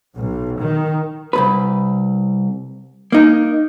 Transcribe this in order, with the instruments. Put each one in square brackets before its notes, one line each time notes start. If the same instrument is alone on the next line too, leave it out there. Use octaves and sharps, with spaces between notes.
[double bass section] B1
D#3
[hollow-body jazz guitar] C2 G2 B4
A#3 D#4